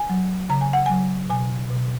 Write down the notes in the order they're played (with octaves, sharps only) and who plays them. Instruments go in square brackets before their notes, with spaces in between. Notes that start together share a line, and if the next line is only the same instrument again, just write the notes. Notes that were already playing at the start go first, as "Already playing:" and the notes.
Already playing: [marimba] G#5
F#3
C#3 A#5
G#5
F#5
F#3 G#5
B2 G#5
B2